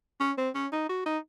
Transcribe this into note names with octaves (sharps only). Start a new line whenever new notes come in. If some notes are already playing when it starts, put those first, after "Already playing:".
C#4
C4
C#4
D#4
F#4
D#4